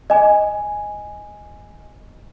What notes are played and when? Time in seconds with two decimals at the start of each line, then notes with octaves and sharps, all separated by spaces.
0.10 D#5 G#5